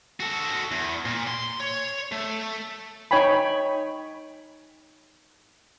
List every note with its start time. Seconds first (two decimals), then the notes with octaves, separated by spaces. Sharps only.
0.20 F#4 A4
0.72 E2
1.05 A#2
1.27 C6
1.60 C#5
2.12 A3
3.11 D#4 C#5 G5 G#5 B5